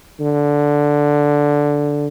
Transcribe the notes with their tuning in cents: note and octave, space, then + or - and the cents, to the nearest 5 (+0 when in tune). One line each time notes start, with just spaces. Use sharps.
D3 -5